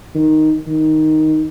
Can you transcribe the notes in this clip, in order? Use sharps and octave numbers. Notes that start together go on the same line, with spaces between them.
D#3
D#3